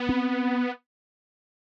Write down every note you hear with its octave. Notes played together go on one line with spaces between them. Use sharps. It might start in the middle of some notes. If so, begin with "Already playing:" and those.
Already playing: B3
C4